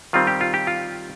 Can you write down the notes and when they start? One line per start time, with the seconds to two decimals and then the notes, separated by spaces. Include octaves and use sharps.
0.13 D#3 G3 C4 F4
0.27 G4
0.41 F4
0.54 G4
0.67 F4